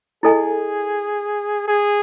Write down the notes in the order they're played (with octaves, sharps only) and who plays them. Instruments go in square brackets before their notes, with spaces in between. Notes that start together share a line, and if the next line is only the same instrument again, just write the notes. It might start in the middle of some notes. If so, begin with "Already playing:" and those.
[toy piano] E4 A4 D#5 G#5 [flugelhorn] G#4
[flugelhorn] G#4